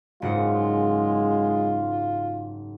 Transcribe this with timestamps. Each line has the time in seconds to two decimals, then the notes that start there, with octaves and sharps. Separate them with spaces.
0.22 F#1 G#2 G#3 F4 F#5